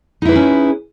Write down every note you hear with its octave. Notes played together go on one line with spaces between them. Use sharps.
C#4 D#4 E4 G#4 B4